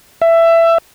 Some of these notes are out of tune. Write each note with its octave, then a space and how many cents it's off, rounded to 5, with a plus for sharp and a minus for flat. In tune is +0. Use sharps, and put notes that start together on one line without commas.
E5 +15